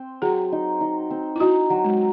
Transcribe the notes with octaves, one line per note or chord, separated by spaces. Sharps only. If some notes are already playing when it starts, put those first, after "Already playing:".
Already playing: C4
F#3 G#4
D#4
D#4
C4
E4
D#4 F#4
F#3
G#3